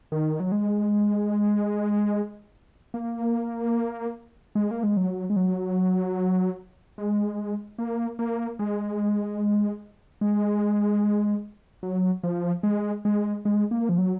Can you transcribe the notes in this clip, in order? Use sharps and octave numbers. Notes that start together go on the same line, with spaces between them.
D#3
F#3
G#3
A#3
G#3
A#3
G#3
F#3
G#3
F#3
G#3
A#3
A#3
G#3
G#3
F#3
F3
G#3
G#3
G#3
A#3
F3
F#3